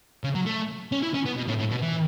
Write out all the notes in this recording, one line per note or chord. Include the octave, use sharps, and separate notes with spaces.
C#3
F#3
A3
C#4
E4
C#4
B3
B2
A2
A2
B2
E3